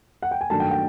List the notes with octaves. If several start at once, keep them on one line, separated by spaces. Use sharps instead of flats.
F#5
G5
G#5
G2 D#3 F#3 A3 D4 A5
G5
G5